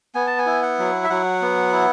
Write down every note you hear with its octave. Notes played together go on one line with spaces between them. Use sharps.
B3 G#5
A5
G#5
E4
F#5
F#3
E5
F#3 F#5
B3
E4